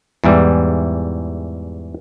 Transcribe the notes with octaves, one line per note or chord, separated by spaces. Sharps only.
E2 G#2 E3 G3